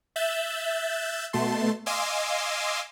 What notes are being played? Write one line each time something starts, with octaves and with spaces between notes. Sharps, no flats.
E5 E6 F#6 G6 A6
B2 A3 A5 C6
D#5 F5 G#5 C6 D6 E6